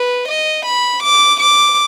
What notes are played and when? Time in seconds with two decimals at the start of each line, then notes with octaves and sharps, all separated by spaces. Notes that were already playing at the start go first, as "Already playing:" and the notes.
Already playing: B4
0.28 D#5
0.66 B5
1.03 D6
1.40 D6